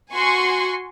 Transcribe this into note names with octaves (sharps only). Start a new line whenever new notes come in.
F#4 G#5 C6 C#6